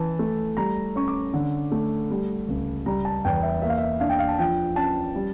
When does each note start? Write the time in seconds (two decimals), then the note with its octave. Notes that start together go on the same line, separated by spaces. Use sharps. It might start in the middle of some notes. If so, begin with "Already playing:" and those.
Already playing: E3 C#4 A5
0.19 A3
0.57 G3 A#5
0.96 C#4 C#6
1.08 D6
1.34 D3
1.72 A3
2.10 G3
2.49 C#2
2.86 G3 A#5
3.05 A5
3.25 E2 G5
3.43 E5
3.62 A#3 E5
3.69 F5
3.78 E5
4.00 D4 F5
4.10 G5
4.19 F5
4.28 A5
4.39 F3 G5
4.76 C#4 A5
5.15 G3